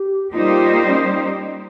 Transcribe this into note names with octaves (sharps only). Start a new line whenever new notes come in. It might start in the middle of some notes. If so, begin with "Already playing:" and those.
Already playing: G4
G3 A#3 D#4 F4 G4 C5
C#4